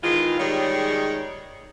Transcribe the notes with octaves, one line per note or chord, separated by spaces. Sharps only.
D#3 E3 G#3 F4
D#3 G3 G#3 G#4 C#5 D5